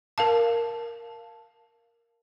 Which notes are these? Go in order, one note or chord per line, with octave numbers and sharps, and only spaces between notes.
A#4 F5 A5